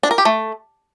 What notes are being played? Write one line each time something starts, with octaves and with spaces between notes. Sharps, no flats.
D4
A#4
G4
A3